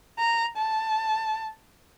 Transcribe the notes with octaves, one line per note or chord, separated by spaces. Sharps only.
A#5
A5